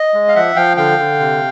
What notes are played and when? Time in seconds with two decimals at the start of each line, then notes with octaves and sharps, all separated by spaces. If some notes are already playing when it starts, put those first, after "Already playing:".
Already playing: D#5
0.14 G#3
0.28 F5
0.35 F3 E5 F#5
0.56 F3 F5 G5
0.77 D3 F5 G5
0.99 D3
1.20 C3